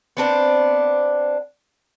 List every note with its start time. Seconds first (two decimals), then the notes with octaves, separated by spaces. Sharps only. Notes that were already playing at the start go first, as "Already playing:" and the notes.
0.17 B3 C4 D4